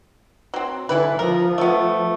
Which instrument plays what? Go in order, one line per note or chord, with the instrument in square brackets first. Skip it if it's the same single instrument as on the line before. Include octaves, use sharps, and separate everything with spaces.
[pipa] F#3 C4
[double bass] D3 [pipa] E3 E4 B4
[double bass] F3 [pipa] A#4
[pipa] A3 B3